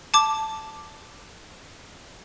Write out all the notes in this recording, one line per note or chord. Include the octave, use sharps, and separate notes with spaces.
A5 D6